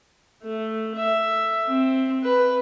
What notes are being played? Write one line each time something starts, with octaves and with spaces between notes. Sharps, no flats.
A3
E5
C4
B4